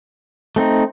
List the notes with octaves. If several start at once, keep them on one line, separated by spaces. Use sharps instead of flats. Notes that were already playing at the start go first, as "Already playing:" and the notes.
A3 C4 D#4